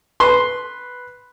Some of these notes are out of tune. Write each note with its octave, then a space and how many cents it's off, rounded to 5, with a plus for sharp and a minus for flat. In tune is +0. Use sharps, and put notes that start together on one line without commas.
B4 +0 C6 +0